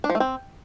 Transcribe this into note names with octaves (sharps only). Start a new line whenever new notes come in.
D4
F3
A3
C4